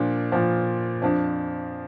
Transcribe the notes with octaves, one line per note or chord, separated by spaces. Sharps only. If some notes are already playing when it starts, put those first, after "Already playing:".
Already playing: A#2 F3 D4
A#2 F3
F2 F3 D4